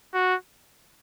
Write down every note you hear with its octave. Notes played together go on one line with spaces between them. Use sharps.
F#4